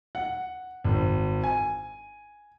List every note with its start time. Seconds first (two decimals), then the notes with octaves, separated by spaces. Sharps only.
0.15 F#5
0.85 G#1
1.44 G#5